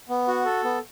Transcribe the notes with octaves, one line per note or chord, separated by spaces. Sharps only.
B3
F#4
A4
B3